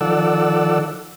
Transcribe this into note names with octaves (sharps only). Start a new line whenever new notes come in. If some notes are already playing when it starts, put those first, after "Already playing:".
D#3 F3 A4 D5 F#5 E6